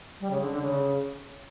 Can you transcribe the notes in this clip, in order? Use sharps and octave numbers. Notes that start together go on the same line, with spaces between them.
G3
C#3
D3
D3
C#3